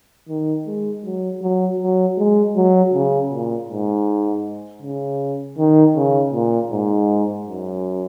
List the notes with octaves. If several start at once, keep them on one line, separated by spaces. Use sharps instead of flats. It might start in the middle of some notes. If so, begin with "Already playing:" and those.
D#3
G#3
F#3
F#3
F#3
G#3
F#3
C#3
A#2
G#2
C#3
D#3
C#3
A#2
G#2
F#2